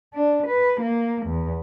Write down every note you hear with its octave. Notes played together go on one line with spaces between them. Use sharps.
D4
B4
A#3
E2